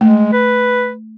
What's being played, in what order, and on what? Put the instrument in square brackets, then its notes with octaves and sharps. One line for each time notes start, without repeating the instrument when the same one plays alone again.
[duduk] G#3 [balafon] A3
[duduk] B4